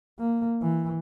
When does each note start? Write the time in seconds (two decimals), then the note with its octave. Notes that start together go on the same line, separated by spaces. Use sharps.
0.19 A#3
0.62 E3